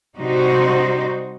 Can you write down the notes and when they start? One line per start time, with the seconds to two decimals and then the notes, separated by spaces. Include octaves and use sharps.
0.18 C3 G3 D#4 F#4 C5